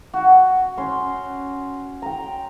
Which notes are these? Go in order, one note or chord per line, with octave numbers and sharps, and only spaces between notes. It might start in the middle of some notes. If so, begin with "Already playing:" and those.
F#4
C#4 C6
G5 A#5